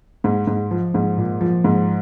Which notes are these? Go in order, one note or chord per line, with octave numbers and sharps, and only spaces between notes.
G#2
G#2
F3
G#2
A#2
F3
G#2